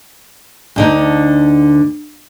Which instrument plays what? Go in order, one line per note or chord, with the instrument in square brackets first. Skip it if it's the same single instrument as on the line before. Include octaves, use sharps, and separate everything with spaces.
[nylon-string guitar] D2 D3 D#4